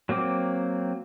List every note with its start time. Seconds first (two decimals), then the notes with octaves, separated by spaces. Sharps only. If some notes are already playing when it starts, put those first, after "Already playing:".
0.09 F#3 A#3 C4 D6